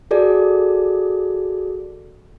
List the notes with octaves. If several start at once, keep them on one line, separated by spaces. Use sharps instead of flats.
F#4 G#4 A4 D5